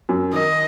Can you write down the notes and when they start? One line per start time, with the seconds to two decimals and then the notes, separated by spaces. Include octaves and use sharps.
0.09 F#2
0.33 D#3 D#5